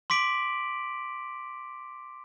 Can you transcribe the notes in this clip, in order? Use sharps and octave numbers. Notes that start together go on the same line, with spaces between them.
C6 D6 B6 D7 F#7